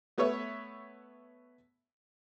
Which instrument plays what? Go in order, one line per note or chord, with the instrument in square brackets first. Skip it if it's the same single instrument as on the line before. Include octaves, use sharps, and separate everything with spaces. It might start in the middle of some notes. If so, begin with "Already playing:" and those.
[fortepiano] A3 B3 B4 C#5 E5